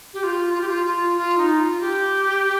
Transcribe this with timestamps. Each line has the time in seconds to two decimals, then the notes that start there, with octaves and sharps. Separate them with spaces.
0.14 G4
0.23 F4
0.54 F4
0.61 G4
0.69 F4
0.86 F4
1.17 F4
1.38 D#4
1.60 F4
1.81 G4